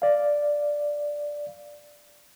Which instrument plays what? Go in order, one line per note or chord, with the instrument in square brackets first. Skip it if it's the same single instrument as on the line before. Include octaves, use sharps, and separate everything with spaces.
[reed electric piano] D5 F5